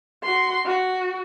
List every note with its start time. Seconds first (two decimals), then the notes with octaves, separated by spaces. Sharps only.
0.23 F#4 C6
0.65 F#4